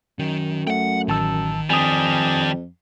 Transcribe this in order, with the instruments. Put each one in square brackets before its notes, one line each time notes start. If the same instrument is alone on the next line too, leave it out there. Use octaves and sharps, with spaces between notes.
[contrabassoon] F#2 [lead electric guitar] D#3
[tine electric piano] A3 [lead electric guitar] F#5 G5
[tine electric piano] A1 A5 E6 [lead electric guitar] D#3
[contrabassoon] F2 [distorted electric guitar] G3 D4 [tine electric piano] G#5 D#6